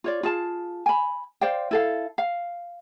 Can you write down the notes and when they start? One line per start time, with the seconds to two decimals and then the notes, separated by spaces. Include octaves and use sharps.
0.04 F4 C#5 D5
0.23 F4 G#4 A5
0.86 G#5 B5
1.41 C5 D5 F5 G5
1.71 E4 A4 F5
2.18 F5